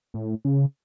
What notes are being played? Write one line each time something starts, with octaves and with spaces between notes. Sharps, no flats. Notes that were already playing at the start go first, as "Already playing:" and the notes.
A2
C#3